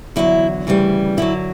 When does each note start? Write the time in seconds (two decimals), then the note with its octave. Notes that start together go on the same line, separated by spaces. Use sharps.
0.16 E2 D3 F#3 E4
0.67 D2 C#3 E3 G3
1.17 F#2 D3 F#3 E4